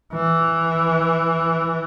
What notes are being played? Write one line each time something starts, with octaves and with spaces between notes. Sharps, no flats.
E3